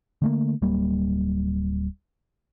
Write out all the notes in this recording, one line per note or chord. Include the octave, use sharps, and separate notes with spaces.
D3 A3 A#3
D1 F#3 G3 A#3